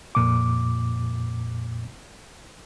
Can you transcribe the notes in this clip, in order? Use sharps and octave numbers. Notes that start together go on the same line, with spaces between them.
F2 A#2 D6